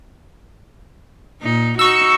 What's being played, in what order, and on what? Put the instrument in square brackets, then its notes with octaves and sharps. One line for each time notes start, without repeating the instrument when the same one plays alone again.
[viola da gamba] A#2 D#4
[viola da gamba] D#4 F#4 [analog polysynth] C#6 E6